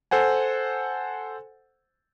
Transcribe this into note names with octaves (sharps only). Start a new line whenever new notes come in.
A4 C5 F#5 G#5